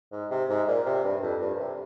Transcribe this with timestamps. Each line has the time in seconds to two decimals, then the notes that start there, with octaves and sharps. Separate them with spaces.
0.12 G#2
0.31 C3
0.49 G#2
0.68 A#2
0.86 C3
1.04 G2
1.23 F2
1.42 G2
1.55 A#2
1.59 C3